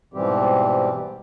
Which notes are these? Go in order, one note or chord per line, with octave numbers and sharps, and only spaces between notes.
G#2 B2 E3 G3 C4 G4